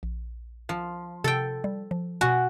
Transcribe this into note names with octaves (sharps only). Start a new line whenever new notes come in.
A#1
F3
C3 A4 G5
G3
F3
B2 F#4 G#5